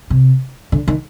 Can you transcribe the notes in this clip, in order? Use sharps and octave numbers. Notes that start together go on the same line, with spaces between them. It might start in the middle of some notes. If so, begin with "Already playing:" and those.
C3
D3
D#3